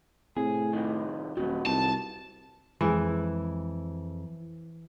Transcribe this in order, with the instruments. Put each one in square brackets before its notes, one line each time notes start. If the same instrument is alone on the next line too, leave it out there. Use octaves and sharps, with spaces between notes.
[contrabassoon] A2 [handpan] C4 [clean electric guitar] G#4
[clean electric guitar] G2 D#3
[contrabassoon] D#1 [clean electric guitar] G2 D#3 [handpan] F#4
[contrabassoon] C2 [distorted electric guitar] A5
[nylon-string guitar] F2 G#3 [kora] E3 E4